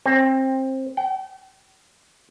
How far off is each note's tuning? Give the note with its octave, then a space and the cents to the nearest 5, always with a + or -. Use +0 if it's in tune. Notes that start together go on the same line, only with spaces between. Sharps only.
C4 +20
G5 -40